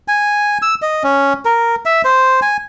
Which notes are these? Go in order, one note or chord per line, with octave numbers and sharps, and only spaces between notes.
G#5
E6
D#5
C#4
A#4
E5
C5
G#5